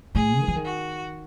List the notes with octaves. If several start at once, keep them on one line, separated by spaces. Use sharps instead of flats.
A2 G#4
D#3
E3
D#3
F#4